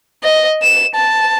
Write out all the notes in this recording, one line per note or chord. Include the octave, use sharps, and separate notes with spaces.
D#5
E7
A5